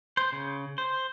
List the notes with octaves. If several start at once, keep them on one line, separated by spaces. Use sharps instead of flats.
C5
C#3
C5